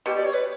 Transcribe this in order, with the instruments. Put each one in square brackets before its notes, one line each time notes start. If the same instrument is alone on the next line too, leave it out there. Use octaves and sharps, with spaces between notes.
[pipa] B2 [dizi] G4
[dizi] D5
C#5
B4